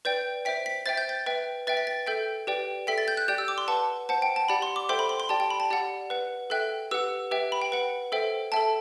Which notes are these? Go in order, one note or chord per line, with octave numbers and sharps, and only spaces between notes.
B4 D5 G5 G6
C5 E5 G5 B6
B6
C5 E5 G5 A6
G6
A6
B4 E5 G5
B4 E5 G5 A6
B6
A6
A4 E5 G5 G6
G4 B4 D5 G5
A4 E5 G5 B6
A6
G6
F#6
G4 D5 G5 G6
E6
D6
C6
B4 F#5 A5
C5 F#5 A5
G5
A5
G4 D5 F#5 B5
C6
D6
A4 C5 E5 G5 C6
B5
C6
C6
G4 D5 G5 A5
G5
B5
A5
G4 D5 F#5
B4 F#5
A4 E5 G5 F#6
G4 B4 F#5 E6
G4 B4 E5 G5
B5
G5
B4 F#5
A4 C5 E5 G5
A4 E5 G5 A5